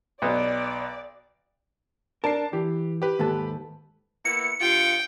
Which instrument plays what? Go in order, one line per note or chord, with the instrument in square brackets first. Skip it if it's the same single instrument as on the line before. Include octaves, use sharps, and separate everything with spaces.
[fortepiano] B1 B3 [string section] D5
[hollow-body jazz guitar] D4 A#4 [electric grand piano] A5 C7
[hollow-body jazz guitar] E3 [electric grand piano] G4
[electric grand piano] G4 B4
[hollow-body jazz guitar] D#2 G#2 A4
[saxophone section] A#3 B3 E4 [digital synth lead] C#7
[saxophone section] G2 F4 [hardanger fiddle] G5